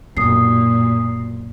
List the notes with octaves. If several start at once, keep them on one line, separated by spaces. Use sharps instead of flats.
B1 F#2 A#2 D#6 C7